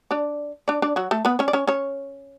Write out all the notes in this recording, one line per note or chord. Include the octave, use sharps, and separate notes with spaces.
D4 D5
D4 D5
D4 D5
F#3 F#4
A3 A4
B3 B4
C#4 C#5
D5
C#4 C#5
C#4 C#5